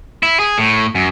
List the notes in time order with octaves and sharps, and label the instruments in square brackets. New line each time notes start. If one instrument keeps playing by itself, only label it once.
[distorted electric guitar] E4
G#4
A2
F#2